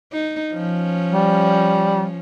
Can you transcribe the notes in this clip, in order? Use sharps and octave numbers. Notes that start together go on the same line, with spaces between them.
D#4
F3 C#4
G3